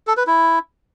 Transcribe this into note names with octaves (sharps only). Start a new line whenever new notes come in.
A4
B4
E4